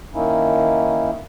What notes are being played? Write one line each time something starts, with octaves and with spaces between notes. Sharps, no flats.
D#3 A#3 C#4 D#4 E4